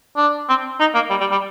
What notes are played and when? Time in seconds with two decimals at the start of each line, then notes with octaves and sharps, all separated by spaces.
0.17 D4
0.49 C4
0.80 D#4
0.95 A#3
1.10 G3
1.21 G3
1.32 G3